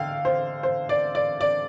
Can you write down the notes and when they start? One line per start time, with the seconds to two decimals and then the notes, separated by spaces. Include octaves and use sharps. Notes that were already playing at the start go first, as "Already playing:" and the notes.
Already playing: D3 F5 G5
0.25 C5
0.63 C5
0.89 D5
1.15 D5
1.41 D5